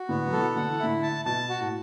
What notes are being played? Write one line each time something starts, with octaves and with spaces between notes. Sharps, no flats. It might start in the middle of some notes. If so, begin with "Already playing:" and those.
Already playing: F#4
A2 D3 B3
F#3
B2 E3 A4
D3 F#5
E3
A2 D3 E4
A5
B2 A5
F#4
A2